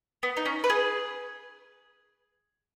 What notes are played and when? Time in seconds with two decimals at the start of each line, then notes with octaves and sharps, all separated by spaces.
0.23 B3
0.37 D#4
0.45 C#4
0.64 B4
0.70 G#4